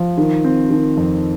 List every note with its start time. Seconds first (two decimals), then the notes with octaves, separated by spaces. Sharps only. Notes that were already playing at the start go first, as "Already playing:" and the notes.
Already playing: F3
0.17 D#3
0.44 C4
0.70 D#3
0.97 F2